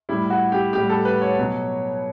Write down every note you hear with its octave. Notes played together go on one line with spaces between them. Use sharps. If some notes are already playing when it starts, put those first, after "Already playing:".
A2 G3 E4
F#4
G4
A2 G3 G4
A4
B4
C#5
B2 F#3